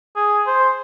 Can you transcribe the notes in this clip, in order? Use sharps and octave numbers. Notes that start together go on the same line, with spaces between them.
G#4
C5